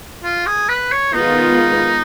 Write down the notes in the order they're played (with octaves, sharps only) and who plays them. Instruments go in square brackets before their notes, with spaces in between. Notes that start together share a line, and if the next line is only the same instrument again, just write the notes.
[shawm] F4
G#4
B4
C#5
[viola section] D#3 G#3 B3 F4 B4 [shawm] D#4